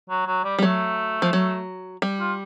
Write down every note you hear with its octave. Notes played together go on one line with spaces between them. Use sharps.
F#3
F#3
G3
G3
F#3 A3
F3
F#3
G3
F4